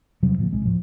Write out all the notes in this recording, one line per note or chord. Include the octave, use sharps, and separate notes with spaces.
E1 C3 F#3 G3
A2 D3 F3 A#3
D1 B1 C3 G#3
A2 F3